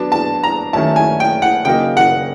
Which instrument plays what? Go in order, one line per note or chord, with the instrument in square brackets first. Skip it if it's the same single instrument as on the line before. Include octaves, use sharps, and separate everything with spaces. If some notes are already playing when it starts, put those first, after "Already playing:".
Already playing: [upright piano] F#3 B3 D4 [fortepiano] A5
[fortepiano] A5
A#5
[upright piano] D#3 F#3 A3 C#4 E4 [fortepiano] A5
[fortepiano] G#5
G5
F#5
[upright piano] C#3 F#3 A#3 D#4 [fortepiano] G5
[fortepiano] F#5